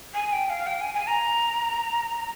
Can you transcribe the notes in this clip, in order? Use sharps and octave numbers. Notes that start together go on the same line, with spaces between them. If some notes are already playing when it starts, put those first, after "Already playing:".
G#5
G5
F5
G5
G#5
G#5
A#5